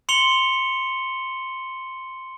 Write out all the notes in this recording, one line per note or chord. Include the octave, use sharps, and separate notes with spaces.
C6 C#7 F7 G7